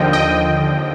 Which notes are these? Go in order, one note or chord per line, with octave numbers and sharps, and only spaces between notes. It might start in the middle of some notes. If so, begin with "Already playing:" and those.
Already playing: D#2 D3 F3 D#5 G5
D#5 G5